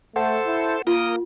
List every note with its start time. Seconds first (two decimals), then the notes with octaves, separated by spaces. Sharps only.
0.16 A3 A4 C5 F#5
0.46 E4
0.87 A#3 F4 A#4 D#6